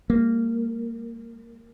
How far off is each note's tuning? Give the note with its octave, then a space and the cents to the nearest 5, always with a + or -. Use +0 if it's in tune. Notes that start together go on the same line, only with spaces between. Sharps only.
G3 +45 A#3 -15